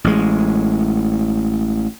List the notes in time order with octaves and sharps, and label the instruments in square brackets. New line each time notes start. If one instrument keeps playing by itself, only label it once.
[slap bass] A1 G#3